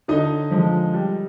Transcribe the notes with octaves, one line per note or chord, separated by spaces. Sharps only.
D3 D#4 D#5
F3 G#3
G3